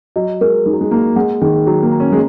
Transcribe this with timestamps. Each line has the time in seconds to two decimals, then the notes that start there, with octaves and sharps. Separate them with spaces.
0.16 F#3 D#5
0.41 G#3 A#4
0.66 G#3 D#4
0.73 F#3
0.81 G#3
0.91 A#3 D#4
1.16 G#3 F#5
1.42 D#3 G#4
1.67 F#3 D#4
1.83 A#3
1.92 A#5
2.00 C#4
2.12 G#3